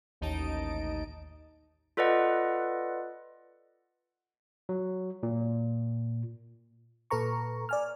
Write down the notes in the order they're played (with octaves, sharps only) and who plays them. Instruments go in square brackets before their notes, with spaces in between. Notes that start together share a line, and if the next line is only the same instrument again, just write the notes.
[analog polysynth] A1 D#2 D#4 D#5 A5 D7
[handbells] F4 A4 B4 D5 D#5 F#5
[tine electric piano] F#3
A#2
[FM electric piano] A#2 A4 B4 A#5 C#6
D5 G#5 F6